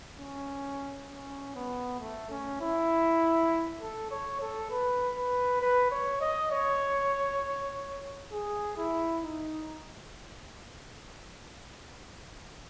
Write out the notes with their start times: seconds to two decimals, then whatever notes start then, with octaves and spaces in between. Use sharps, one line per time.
0.19 C#4
1.10 C#4
1.55 B3
2.00 A3
2.30 C#4
2.61 E4
3.81 A4
4.11 C#5
4.41 A4
4.70 B4
5.16 B4
5.61 B4
5.91 C#5
6.21 D#5
6.51 C#5
8.32 G#4
8.77 E4
9.23 D#4